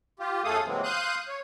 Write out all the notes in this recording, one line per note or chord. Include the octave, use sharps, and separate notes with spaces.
F4 G4
F#2 A3 G#4 A4 F5 D#6
C3 E3 F#3 G#3 A#3 C4
F5 C6 D#6 F#6 G6
C#5